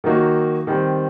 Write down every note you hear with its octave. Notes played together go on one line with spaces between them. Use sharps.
D#3 F#3 A#3 D#4 F#4
D#3 G3 C4